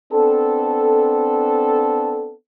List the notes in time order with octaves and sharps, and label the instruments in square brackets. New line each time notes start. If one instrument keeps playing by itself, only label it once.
[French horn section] B3 C4 D4 A4